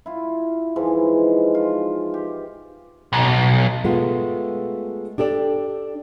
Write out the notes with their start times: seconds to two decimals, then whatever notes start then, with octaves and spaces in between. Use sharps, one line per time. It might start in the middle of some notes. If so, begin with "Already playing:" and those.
0.06 E4 F4
0.76 G#2 E3 F3 G#3
1.55 F4
2.14 G4
3.13 B1
3.85 G#3 A3 B3 F4
5.18 D4 G4 A4 D5